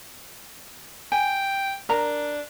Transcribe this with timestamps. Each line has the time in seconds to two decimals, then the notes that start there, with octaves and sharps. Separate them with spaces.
1.12 G5 G#5
1.89 D4 A#4 A#5